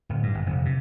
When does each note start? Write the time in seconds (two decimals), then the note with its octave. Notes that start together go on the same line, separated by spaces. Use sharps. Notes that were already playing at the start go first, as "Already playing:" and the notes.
0.09 D1
0.23 G2
0.35 G1
0.46 F1
0.65 C3